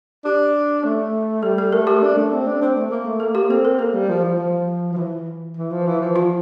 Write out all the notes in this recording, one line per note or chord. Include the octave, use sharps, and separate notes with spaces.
D4 G4
A3
G3 A4
A4
A3 A#4
G4
D4
A3
C4
D4
C4
A3
A#3
A3
A#3 A4
G4
C4 A4
A#4
A#3 A4
G3
F3
F3
F3
F3
E3
E3
F3
E3
F3
F4